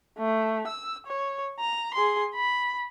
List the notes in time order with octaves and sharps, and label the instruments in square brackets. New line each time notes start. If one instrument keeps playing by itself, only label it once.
[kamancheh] A3
E6
C#5
A#5
G#4 C6
B5